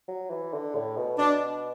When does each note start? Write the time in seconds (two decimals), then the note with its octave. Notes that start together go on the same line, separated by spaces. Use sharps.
0.08 F#3
0.30 E3
0.53 D3
0.74 A2
0.97 B2
1.18 B2 D4